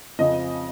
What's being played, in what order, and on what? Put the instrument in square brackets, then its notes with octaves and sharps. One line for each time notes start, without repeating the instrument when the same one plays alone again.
[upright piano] F2 C#3 F3 D#5